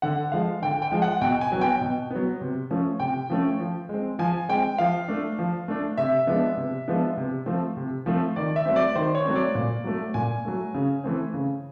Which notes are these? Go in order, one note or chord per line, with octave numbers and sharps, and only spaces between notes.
D3 F#5
F3 G#3 F5
D3 G5
G5
F3 G#3
F#5
B2 G5
G#5
F#3 B3
G5
B2
B3
F#3
C3
F3 A3 C#4
C3 G5
F3 A3 C#4
F3
G#3 C4
F3 G#5
G#3 C4 G5
F3 F5
A3 D4
F3
A3 D4
C3 E5
F3 G#3 B3 D4
C3
F3 G#3 B3 D4
C3
F3 A3 C4
C3
F3 A3 C4
D#3 D5
E5
F#3 A3 C4
D5
D#3 C5
C#5
F#3 A3 C4
D5
A#2
F#3 A3
A#2 G#5
F#3 A3
C#3
E3 A3 C4
C#3